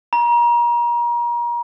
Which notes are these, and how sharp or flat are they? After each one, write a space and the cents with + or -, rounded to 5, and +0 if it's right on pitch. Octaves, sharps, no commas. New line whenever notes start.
A#5 +35